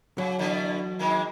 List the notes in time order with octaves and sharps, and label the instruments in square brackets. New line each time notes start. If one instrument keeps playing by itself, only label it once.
[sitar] C#3 [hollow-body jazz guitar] F#3
[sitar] B2 D3 E3
D#3 G#3 A#3